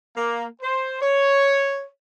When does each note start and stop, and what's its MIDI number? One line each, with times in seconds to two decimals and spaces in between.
0.16 0.45 58
0.62 1.00 72
1.01 1.86 73